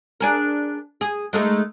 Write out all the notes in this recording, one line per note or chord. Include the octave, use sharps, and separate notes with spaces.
D4 G#4 A#4
G#4
G#3 A3 D#4